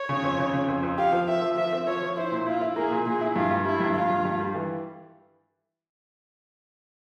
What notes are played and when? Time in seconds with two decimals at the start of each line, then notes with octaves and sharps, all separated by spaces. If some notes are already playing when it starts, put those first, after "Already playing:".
Already playing: C#5
0.09 C#3
0.23 F2
0.39 C#3
0.53 C#3
0.68 F2
0.83 F2
0.98 G4 F5
1.12 F3
1.28 F3 E5
1.42 F3
1.57 F3 E5
1.73 C4
1.87 F3 C#5
2.02 F3
2.17 E4 C5
2.32 A#2
2.46 E4 F4
2.61 E4
2.76 A#3 G#4
2.91 A#2
3.06 A#2 G#4
3.21 E4
3.36 G2 F4
3.51 G2
3.66 G3 E4
3.80 G2
3.95 G2 F4
4.10 G2
4.25 G2
4.40 G3
4.55 E3